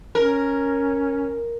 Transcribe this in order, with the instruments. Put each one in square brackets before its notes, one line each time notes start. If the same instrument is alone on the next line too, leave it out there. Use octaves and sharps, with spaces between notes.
[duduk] C#4 [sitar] A#4